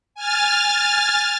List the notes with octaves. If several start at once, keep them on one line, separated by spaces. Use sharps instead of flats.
G#5 F6 A6